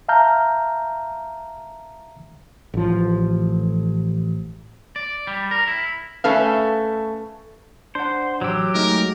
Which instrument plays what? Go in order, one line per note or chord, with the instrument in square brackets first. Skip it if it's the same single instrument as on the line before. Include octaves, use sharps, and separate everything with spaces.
[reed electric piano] E5 F5 A5 A#5 F6 G6
[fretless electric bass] A1 F3
[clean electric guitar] D5
G3
A#4
E4
[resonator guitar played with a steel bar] A3 C#4 A4 B4 F5
[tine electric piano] D4 F#5 [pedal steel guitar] C5
[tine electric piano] A1 E6 [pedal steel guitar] F#3 G4
[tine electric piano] G#3 A3 D#4 [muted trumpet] A#4